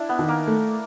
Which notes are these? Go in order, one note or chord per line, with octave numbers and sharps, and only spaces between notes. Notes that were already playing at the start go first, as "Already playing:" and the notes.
Already playing: D4 E4
B3
D#3
A#3
A3